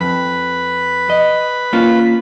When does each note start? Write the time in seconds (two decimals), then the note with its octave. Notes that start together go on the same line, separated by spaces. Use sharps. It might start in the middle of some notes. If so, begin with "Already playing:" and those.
0.01 F2 B4 B5
1.10 D#5
1.73 A#3 C#4 F4